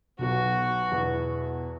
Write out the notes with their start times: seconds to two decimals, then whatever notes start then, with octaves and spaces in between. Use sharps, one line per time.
0.19 B1 B2 F#3 F#4
0.92 E2 B2 B3 E4